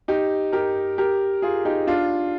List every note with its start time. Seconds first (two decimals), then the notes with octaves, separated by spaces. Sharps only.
0.08 D#4 G4
0.52 G4 A#4
0.98 G4 A#4
1.42 F4 G#4
1.65 D#4 G4
1.87 D4 F4